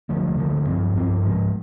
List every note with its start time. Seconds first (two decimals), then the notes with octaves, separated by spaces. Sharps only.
0.09 D2 D3 F3 A#3
0.38 D2 D3 F3 A#3
0.66 G2 F3 C4
0.94 G2 F3 C4
1.23 G#2 F3 G#3